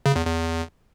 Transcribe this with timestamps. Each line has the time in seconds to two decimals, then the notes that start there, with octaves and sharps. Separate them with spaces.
0.06 C#3
0.16 E2
0.26 E2